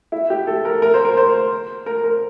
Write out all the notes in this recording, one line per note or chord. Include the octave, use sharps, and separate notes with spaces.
E4
G4
A4
A#4
A#4
C5
A#4
C5
A#4
A#4